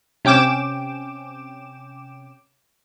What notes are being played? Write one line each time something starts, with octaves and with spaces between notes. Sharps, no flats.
C3 C#4 G5 D6 E7